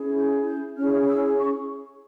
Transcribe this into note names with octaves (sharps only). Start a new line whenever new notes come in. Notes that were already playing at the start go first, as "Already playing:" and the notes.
Already playing: C#4 E4 G#4
G#6
G6
G6
C#4 E4 G#4 F6
E6
C#6